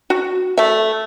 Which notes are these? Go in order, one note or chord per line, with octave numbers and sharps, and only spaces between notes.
F#4
A3 E5